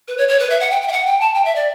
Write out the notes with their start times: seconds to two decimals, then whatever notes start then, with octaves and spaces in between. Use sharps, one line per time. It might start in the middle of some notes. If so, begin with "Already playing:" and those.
0.08 B4
0.18 C#5
0.28 C#5
0.39 B4
0.50 E5
0.60 F#5
0.71 G5
0.81 G5
0.88 E5
0.92 F#5
1.06 G5
1.20 A5
1.34 G5
1.45 E5
1.55 D5